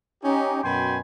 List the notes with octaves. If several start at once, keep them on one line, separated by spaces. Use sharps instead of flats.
C#4 D#4 G4
F#2 B2 G5 G#5 B5 C6